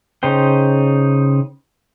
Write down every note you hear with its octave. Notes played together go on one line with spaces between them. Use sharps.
C#3 D#4 C5 G5